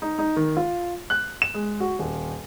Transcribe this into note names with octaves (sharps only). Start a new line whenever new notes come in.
D#4
D#4
D#3
F4
F#6
E7
G#3
F#4
D#1